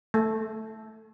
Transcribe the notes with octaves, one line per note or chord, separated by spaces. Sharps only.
A3